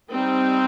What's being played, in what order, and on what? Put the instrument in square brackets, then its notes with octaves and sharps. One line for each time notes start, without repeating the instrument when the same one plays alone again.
[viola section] G3 C4 D#4